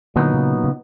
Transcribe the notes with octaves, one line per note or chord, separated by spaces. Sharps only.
A#2 D3 F#3 B3 D#4
C#3
C#3